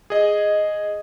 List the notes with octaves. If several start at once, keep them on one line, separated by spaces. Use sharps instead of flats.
G#4 D#5